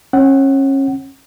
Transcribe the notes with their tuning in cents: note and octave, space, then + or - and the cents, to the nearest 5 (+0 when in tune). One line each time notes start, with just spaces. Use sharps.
C#4 -30 F#5 +15